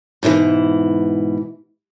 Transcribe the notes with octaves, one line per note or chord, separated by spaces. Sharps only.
G#2 B2 D#3 E3